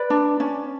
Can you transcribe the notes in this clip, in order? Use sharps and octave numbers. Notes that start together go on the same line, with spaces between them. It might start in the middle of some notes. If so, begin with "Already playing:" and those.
Already playing: B4 D5
D4
C#4